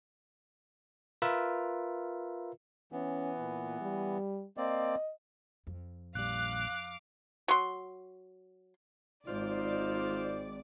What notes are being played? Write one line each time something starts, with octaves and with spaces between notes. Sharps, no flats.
F4 A#4 B4 E5
E3 B3 C#4
A#2
G3
A#3 C4 D5 D#5
F2
A#1 G3 F5 D6 F#6
F#3 C6
G#1 D#4 F4 C5 D5